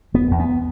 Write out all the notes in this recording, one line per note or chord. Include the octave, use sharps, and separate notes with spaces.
E1 B3
E2
B3